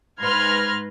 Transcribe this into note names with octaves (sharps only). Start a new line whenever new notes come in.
G#2 B4 C6 F6 G#6 A#6